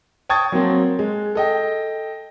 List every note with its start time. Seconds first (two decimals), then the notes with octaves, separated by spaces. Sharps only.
0.29 G5 A5 C#6 D#6 G#6 A6
0.52 F#3 A#3 C4
0.99 G#3
1.35 A4 D#5 G5